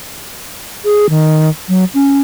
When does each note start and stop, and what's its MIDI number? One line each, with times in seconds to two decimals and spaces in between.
0.85 1.06 68
1.10 1.50 51
1.69 1.85 54
1.94 2.22 61